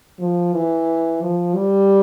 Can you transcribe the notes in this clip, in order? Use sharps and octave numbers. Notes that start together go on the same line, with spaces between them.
F3
E3
F3
G3